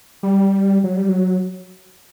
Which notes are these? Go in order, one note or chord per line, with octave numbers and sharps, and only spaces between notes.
G3
F#3
G3
F#3